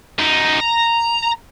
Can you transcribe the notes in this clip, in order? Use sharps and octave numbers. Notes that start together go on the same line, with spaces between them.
F#2 D#4
A#5